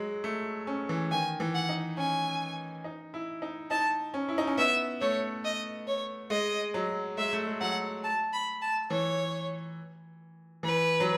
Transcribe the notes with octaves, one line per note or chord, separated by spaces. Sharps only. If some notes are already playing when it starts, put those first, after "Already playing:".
Already playing: F#3 G#3
A3
C#4
E3
D#3 G#5
E3
F#5
D#4
C#4 G#5
D#4
E4
D#4
D#4 A5
C#4
E4
D#4
C#4
B3 E5
A3 C#5
D#5
C#5
G#3 D#5
F#3
G#3 E5
A3
G#3
F#3 F#5
A5
B5
A5
E3 C#5
E3 B4
F#3